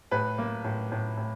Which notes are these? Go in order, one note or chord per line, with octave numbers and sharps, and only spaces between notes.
A2 B4
A#3
A2
A2
A2